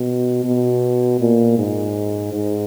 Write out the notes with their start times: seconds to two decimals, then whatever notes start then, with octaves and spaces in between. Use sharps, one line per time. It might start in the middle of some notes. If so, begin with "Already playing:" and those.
Already playing: B2
0.44 B2
1.20 A#2
1.58 G#2
2.33 G#2